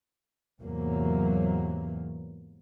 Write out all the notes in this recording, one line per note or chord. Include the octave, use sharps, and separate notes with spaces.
E2 G#2 C3 F#3 A#3